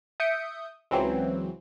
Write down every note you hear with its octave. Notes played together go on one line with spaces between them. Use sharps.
E5 D#6 G6 C#7 D7
C#2 E3 F#3 C4